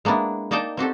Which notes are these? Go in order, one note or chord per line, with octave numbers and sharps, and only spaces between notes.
G#3 A#3 B3 D4 E4
A#3 D#4 D5 D#5 G5 A5
C4 F#4 G4 A4